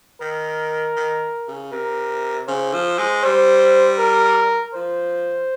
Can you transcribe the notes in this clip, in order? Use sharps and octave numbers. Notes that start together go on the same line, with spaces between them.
D#3 A#4
D#3
C#3
C3 A#4
C#3 C5
F3
G#3
G3 C5
A#4
F3 C5